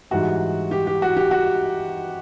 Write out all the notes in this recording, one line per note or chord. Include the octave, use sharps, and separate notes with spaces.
G#2 E3 G3 F#4
G4
G4
F#4
G4
F#4